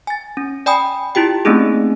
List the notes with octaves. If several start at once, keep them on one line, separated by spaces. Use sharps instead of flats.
G#5 A6
C#4
D5 G5 G#5 B5 D#6
E4 F4 G4 G5
A3 A#3 C4 C#4 D#4 G#4